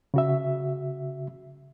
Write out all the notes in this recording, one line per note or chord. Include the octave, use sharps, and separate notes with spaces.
C#3 F#4 E5